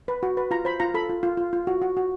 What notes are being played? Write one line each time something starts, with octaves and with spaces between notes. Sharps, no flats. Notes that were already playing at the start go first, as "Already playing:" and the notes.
B4
F#4
B4
F4 A#5
C5 B5
F4 A#5
A4 B5
F4
F4
F4
F4
F#4
F#4
F#4